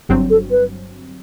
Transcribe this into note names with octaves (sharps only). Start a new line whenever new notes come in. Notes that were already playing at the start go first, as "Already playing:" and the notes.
G1 G2 F#3 C4
A4
B4